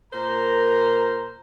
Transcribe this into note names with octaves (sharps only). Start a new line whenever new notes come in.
A#2 A#4 C5 A#5